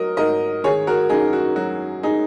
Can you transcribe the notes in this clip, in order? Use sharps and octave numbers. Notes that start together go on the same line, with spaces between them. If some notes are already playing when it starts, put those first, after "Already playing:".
Already playing: F#3 F#4 A#4 D#5
G#2 A#4 D#5
D#3 G#4 C#5
F#4 A#4
F#2 D#4 G#4
F#4
F#3 F#4
D#4 G#4